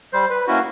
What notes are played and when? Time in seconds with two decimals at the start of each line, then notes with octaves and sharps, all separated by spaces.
0.13 G3 C5
0.30 B4
0.47 A#3 C#4 E4 F#4